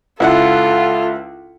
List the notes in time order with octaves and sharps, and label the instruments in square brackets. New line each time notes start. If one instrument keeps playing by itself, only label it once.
[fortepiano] C#2 E4 F#5 [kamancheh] F4 A4